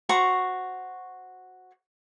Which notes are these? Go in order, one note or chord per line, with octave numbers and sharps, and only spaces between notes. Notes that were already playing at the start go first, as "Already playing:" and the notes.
F#4 C5 A#5 C#6